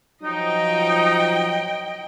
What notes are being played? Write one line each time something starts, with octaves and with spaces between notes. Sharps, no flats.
F3 F#3 D#4 D#5 G5